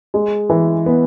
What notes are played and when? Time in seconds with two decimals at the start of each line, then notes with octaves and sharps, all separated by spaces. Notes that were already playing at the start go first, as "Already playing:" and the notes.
0.14 G#3
0.50 E3
0.86 B3